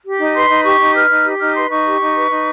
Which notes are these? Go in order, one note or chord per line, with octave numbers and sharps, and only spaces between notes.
G4
D#4
B4 C6
D#4
G4 C#6
D#4
B4 F6
D#4
G4
D#4 F6
B4 C6
D#4 C#6
G4
D#4
B4
D#4